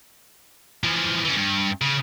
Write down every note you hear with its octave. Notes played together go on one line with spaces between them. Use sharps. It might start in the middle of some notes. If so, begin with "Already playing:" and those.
E3 F3
E3 C#4
G2
C#3